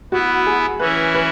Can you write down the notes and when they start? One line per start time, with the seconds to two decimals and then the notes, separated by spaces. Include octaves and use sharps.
0.12 B3 E4 F#4 B4
0.47 G#4
0.79 E3 C#4 E4 B4
1.14 B4